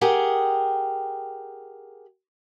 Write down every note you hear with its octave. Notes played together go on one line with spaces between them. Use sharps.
G4 G#4 A#4 F#5 G5